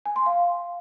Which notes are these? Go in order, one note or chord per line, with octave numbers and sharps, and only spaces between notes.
G#5
C6
F5